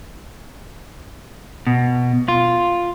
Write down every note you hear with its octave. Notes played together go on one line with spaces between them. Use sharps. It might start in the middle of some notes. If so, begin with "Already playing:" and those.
B2
F4